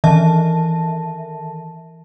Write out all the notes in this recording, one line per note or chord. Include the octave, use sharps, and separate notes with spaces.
D#3 E3 E5 A5